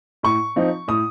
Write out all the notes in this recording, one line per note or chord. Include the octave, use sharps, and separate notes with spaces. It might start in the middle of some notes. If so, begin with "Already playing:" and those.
A2 C#6
F3 C4 D#4
A2 D#6